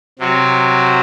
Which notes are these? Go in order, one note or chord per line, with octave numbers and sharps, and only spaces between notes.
C3 F#3 C4 F#4